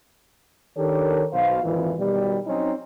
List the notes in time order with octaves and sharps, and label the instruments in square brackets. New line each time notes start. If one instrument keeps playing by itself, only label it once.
[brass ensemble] D#3 D4 G4 A4 A#4 C#5
B1 B2 C5 F5
G#1 F2 A#2 E3
B2 D#3 F#3 G3
F#3 C4 C#4 D#4